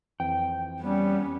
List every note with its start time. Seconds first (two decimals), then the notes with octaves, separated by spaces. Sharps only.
0.20 F2 E3 C4 G5
0.80 G3 B3 C#4